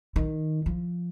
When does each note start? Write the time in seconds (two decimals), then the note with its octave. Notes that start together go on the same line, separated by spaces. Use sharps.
0.16 D#3
0.66 F3